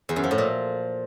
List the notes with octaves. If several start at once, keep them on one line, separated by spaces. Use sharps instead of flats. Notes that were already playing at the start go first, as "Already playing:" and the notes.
E2
F#2
F3
A2
A#2